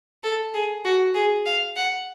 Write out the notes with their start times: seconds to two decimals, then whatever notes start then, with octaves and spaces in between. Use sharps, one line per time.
0.24 A4
0.54 G#4
0.85 F#4
1.14 G#4
1.46 F5
1.76 F#5